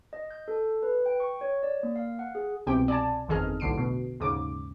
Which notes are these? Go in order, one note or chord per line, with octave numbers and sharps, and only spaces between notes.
D#5
G6
A4
B4
G5
C#6
C#5
D5
A#3
F5
F#5
G#4
C2 B2 C4 G4 G5
D5 G#5 A5
G1 F2 D#3 G#4 D#5 F6
B1 A2 D3 C7 D7
B2
D#2 G#2 C#3 D6